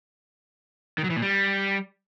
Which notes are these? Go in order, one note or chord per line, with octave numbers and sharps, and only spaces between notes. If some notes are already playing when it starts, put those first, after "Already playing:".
D#3
F#3
E3
A#2
G3